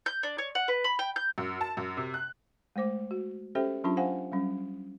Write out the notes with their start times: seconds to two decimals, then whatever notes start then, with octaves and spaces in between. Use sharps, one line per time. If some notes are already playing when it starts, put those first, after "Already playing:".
0.06 G6
0.23 D4
0.38 C#5
0.55 F#5
0.68 B4
0.84 B5
0.99 G5
1.16 G6
1.38 F#2
1.61 A5
1.77 F#2
1.97 C3
2.14 F#6
2.76 G#3 A3 C5 D6
3.11 F#4
3.55 C#4 G4 A4 C5 E5 G5
3.84 F#3 C#4 D4 F4 A5
3.97 C5 F5 F#5 G#5
4.32 F#3 G3 C#4